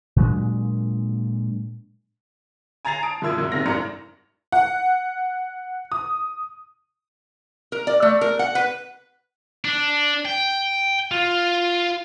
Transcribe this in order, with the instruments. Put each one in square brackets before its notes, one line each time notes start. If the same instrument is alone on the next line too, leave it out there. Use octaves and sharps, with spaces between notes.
[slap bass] A#2 F#3 G#3 D4
[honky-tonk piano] G#5 A#5 G#6 A6 C7 F7
A5 D#6 D7
F#2 A#2 E4 E6 G#6
F#2
G#2 C3 F6 A#6
G#1 F#2 A2 D4 A#5 C#7
F#5
D#6
[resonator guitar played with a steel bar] A#4
D5
A3
A#4
F#5
B4
[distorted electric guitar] D4
G5
F4